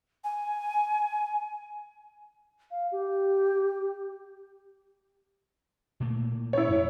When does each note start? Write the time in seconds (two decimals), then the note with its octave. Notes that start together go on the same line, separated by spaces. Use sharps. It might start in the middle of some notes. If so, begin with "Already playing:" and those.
0.24 G#5
2.71 F5
2.92 G4
6.00 A#2 A3 A#3
6.53 E4 C#5
6.70 F2